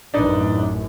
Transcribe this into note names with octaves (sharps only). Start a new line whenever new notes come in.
A1 F#2 A2 D4 D#4 B4